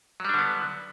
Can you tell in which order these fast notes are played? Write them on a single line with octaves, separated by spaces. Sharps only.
F#3 G3 D4 D3 B3